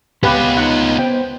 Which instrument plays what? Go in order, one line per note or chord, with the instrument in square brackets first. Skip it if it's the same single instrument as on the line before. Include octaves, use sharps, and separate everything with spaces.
[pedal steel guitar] B3 [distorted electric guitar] C#4 F4 [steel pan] G4 B4 F#5
[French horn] D#4 [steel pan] F#5
[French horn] C5 [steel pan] G5